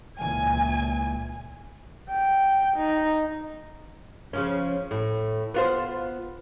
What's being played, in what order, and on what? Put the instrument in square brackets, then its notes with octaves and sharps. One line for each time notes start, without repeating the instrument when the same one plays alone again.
[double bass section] C#2 A#2 E3 [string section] G#5
[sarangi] G5
D#4
[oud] C#3 F3 C#4
A2
B3 F4 C5